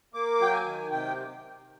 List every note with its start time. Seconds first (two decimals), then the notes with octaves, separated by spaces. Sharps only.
0.14 A#3 D6
0.40 F#3 G5
0.53 G#5
0.66 D#3
0.91 C3 G5